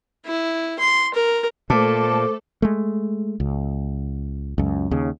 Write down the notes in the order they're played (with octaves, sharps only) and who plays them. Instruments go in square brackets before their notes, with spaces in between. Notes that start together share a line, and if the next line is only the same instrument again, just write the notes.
[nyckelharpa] E4
C6
A#4
[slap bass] A#2 [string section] A3 A4 [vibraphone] C5 D6 [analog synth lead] A5
[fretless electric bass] G#3 A3
C#2
C#2 F#2
D#2 C#3